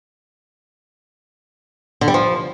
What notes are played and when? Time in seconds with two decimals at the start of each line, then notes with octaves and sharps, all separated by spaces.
2.01 D3
2.08 G3
2.14 F3